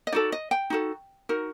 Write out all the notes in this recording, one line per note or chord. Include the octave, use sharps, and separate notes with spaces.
D#5
D#4 F#4 A4 D5
D#5
G5
D#4 F#4 A4
D#4 F#4 A#4